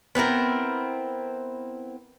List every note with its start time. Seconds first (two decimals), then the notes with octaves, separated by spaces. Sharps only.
0.15 B3 C4 E4 A#4